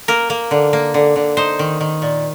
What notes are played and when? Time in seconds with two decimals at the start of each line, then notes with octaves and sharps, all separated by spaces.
0.08 A#3 A#4
0.30 A#3
0.51 D3
0.73 A#3
0.94 D3
1.16 D3
1.37 D#4 C5
1.59 D#3
1.81 D#3
2.02 A#2